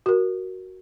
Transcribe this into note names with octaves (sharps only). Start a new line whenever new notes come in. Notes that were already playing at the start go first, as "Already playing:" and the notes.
F#4 A#4